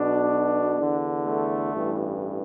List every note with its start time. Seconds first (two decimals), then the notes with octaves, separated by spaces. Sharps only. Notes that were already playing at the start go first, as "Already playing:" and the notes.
Already playing: B1 B2 D4
0.77 E2 D3
1.25 A3
1.73 A1 G2 E3